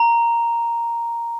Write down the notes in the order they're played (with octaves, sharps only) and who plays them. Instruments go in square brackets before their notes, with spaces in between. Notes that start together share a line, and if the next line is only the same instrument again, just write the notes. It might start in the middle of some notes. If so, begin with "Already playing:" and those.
Already playing: [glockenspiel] A#5